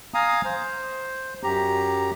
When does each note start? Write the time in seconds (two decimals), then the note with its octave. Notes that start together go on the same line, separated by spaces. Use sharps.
0.14 F5 G#5 A#5 D#6
0.45 C5
1.43 F#2 G4 A#5